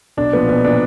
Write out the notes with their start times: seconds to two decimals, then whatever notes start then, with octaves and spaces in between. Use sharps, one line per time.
0.17 B1 D4
0.33 A#2 F3 B3
0.49 B1 B3
0.64 A#2 F3 D4